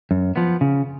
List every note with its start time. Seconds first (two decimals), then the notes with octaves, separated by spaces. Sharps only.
0.11 F#2
0.36 F3 B3
0.61 C#3